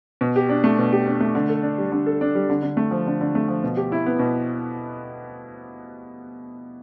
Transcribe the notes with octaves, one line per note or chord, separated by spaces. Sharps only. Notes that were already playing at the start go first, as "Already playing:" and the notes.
B2
G4
D4
A3
B2
G4
D4
A3
D3
A4
D4
G3
D3
A4
D4
G3
D3
D3
A3
F3
D3
D3
A3
F3
B2
G4
E4
B3
B2